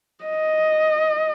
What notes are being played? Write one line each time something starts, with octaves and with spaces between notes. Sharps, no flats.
D#5